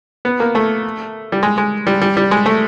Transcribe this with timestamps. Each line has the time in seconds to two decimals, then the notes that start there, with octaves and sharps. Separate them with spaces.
0.25 B3
0.40 A#3
0.55 A3
1.32 G3
1.43 G#3
1.58 G#3
1.87 G3
2.01 G3
2.17 G3
2.31 G#3
2.46 A3